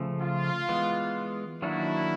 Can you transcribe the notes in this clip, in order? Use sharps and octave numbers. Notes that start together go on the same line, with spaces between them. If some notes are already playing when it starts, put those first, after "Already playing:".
Already playing: C#3 F3 A3
F4
E3 G#3 B3
D#3 F#3 A#3 D4 E4 F#4